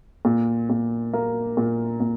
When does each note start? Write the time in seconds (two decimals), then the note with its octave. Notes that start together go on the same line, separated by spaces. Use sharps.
0.25 A#2
0.70 A#2
1.13 A#3
1.57 A#2
2.00 A#2